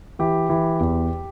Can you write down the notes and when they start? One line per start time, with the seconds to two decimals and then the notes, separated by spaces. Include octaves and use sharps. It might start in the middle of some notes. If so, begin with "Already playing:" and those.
0.19 E3 G4
0.49 E3
0.80 E2